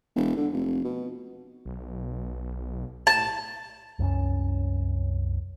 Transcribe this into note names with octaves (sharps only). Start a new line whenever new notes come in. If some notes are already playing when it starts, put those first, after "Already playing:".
E1
D3
F1
B2
B1
A2 A5
C2 F#2 C4 C#4